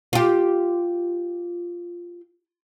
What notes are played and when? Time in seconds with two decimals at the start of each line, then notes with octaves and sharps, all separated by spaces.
0.13 F4 G4